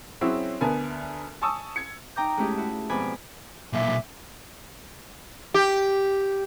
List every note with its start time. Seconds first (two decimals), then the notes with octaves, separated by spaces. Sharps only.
0.21 F#3 C4 C#4 E4 F#4 G#4
0.61 D2 B3 A#4 G#5 A5
1.42 G#5 A5 C#6 D#6 E6
1.76 G#6 C#7
2.16 D#4 G5 A#5 D6 G6
2.37 G#3 A3 C#4 E4 G4 G#4
2.57 E4 F#4
2.89 F2 G#2 B2 D5 G#5 B5
3.73 B1 A#2 E5 G#5 D6
5.54 G4